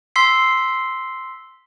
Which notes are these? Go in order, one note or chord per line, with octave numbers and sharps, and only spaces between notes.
C6 E6 B6 C7